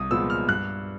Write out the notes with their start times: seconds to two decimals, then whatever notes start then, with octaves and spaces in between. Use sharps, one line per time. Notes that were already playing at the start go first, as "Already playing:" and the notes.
Already playing: C2 D#6
0.10 A#2 F3 G#3 B3 E6
0.30 F6
0.48 G2 F#6